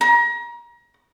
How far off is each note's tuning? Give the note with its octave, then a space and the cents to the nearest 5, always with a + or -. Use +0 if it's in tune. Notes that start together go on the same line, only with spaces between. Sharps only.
A#5 +30